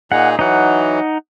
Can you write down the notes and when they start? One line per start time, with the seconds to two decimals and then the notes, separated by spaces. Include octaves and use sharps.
0.12 A#2 D#4 G#4 F#5
0.39 E3 F#3 D#4 F#5